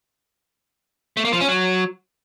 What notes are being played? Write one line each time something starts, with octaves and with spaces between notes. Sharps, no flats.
A3
A#3
F3
C#4
F#3